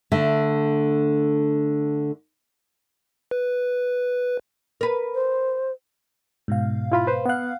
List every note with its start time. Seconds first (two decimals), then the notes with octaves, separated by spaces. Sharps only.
0.12 D3 A3 E5
3.31 B4
4.81 A#4 B4
5.14 C5
6.48 G#2 B2 F5
6.92 E4 F4 B5
7.07 B4 C5
7.26 B3 F5 F#5 F#6